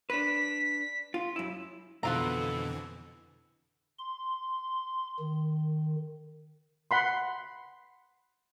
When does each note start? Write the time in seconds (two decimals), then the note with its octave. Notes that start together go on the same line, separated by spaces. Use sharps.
0.10 D4 B4 B6
1.14 F4
1.36 F#2 E4
2.03 F2 B2 D3 E3 B3 F4 A4 A#5
3.99 C6
5.20 D#3
6.91 F#5 B5 C6